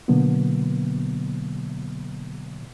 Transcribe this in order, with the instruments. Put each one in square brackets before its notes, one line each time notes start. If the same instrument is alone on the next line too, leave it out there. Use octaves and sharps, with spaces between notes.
[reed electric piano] B2 D3 F#3 A#3 B3